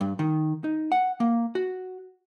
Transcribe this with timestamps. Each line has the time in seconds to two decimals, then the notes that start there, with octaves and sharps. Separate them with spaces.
0.01 G2
0.19 D#3
0.64 D#4
0.92 F#5
1.20 A#3
1.55 F#4